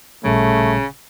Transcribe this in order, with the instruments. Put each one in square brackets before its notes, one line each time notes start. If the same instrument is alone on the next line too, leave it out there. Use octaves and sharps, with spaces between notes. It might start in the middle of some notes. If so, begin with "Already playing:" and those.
[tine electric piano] A1 A#2 G3 [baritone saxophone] C#3 [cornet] A3